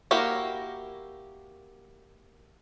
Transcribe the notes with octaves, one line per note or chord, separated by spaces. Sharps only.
A#3 E4 F#4 G4 A#4